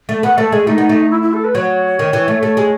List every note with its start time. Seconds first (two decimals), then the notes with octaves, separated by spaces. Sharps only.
0.09 A3
0.23 B3 F#5
0.38 A3 A4
0.52 G#3 G#4
0.67 A3 D#4
0.78 B3
0.89 A3
1.11 E4
1.22 E4
1.33 A4
1.44 B4
1.55 F#3 C#5
1.99 D#3
2.13 E3
2.28 A3
2.43 A3
2.57 G#3